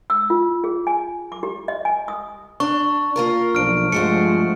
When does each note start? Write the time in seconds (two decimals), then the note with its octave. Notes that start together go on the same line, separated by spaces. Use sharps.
0.10 E6
0.30 F4
0.64 G#4
0.87 G#5
1.32 D6
1.43 G4
1.68 D#5
1.85 G#5
2.08 D#6
2.60 D4 C#6
3.16 A#3 F4 A#4
3.55 B1 F3 D4 F6 D7
3.92 G2 F3 G#3 A3 F#4 C5 C#7